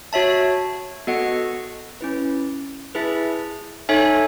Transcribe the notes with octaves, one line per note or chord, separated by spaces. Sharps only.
F#4 C#5 E5 A5
B3 F#4 A4 D#5 F#5
C#4 E4 B4
E4 G#4 B4 E5 A5
D#4 A4 C#5 E5 G#5